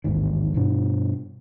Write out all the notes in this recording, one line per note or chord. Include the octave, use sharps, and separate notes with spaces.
A1 D#2 G#2 D#3
G2 B2 D4